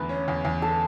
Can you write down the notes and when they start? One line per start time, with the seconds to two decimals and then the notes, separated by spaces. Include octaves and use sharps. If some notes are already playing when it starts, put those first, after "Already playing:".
Already playing: E2 D3 A3 B4
0.09 C#4
0.28 E2
0.45 E2
0.62 D3 A4